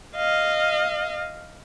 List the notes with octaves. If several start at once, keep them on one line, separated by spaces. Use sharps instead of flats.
D#5 F5